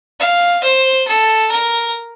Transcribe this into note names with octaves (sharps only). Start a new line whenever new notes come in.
F5
C5
A4
A#4